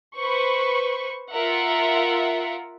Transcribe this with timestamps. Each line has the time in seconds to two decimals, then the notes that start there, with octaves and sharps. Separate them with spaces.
0.15 B4 C5 C#6
1.31 F4 A#4 E5 F#5